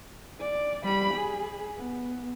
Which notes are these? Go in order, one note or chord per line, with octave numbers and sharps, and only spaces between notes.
D5
G3 B5
G#4
B3